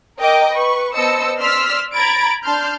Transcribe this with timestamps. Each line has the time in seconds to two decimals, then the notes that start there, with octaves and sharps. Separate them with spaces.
0.19 A#4 D#5 G5 D6
0.51 B4 C#6
0.94 B3 C5 D#5 A5 E6 C#7
1.38 D5 C6 E6 F6 B6
1.93 A#5 B5 G#6 A6 D7
2.43 D4 A5 C6 F6 G6